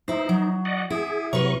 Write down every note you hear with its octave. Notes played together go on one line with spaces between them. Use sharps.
D#4 E4 C5
F#3
D5 D#5 F#5
E4 G#4
C3 F#3 A#4 B4 C#6